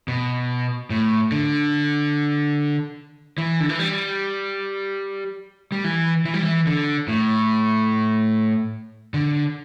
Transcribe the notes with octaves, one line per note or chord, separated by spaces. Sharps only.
B2
A2
D3
E3
D3
E3
G3
G3
E3
E3
G3
E3
D3
A2
D3